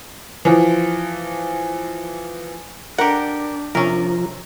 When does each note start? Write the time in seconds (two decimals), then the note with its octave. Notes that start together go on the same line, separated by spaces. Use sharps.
0.45 E3 F3
2.98 D4 G4 A#4 F#5
3.75 C3 F3 C#4 A#4